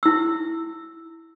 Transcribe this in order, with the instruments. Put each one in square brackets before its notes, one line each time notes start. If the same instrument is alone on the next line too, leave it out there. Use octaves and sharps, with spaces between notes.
[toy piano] E4 E6